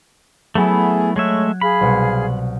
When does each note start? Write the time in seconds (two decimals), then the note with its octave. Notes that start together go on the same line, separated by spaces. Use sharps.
0.55 F#3 A3 B3 E4 G#4
1.16 G#3 A3 C#5 E5 C#6 F#6 G#6
1.61 G#4 F5 B5 F6
1.81 C2 B2 F#5